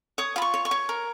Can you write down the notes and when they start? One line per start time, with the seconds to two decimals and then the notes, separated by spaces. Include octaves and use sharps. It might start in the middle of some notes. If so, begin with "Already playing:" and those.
0.18 C#5 D#6
0.36 F4 B5
0.42 C#6
0.54 C#5
0.65 C#6
0.71 C#5
0.89 A#4